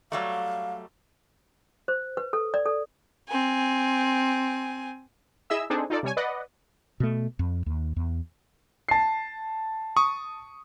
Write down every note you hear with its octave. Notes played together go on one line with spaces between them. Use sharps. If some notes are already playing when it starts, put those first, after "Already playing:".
F#3 G3 A3 F5
C5
B4
A4
D5
A4
C4 G#5
E4 G#4 D#5 E5 E6
C4 D4 D#4 G#4 A4 C5
D#4 F4 A4 D5
C3 G3 C#5 G#5
B4 D5 D#5 F#5
B2 A3
F2
D#2
E2
A5 C7
C#6 D#6